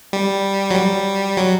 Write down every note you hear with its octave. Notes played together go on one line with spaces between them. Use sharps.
G3
F#3
G3
F#3